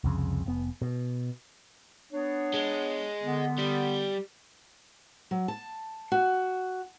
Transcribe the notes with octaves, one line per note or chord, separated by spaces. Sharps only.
C2 F2 C#3
F1 B3
B2
B3 D4 C#5
G#3
D3 B3
G3
F#3
A5
F#4